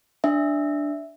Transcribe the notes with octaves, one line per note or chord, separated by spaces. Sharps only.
D4 E5